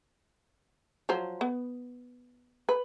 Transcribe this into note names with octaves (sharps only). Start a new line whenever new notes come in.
F3 F#3 C5
B3
B4